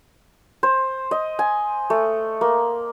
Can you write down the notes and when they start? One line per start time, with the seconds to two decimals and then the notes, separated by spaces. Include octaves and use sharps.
0.63 C5
1.11 D#5
1.39 G#5
1.90 A3
2.41 A#3